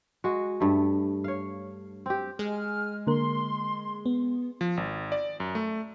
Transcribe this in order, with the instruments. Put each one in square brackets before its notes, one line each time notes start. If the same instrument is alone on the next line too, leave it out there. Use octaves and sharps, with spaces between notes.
[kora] G#3 F#4
G2 A3
C#5 F5
C4 G4
[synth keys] G#3 [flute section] G#5 F6
[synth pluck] D3 A#3 A#4 [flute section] C6
[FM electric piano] B3
[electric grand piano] F3
G#1
D5
F#2
A3